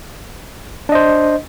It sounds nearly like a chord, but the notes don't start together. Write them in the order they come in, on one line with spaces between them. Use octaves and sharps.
D4 D#5 C5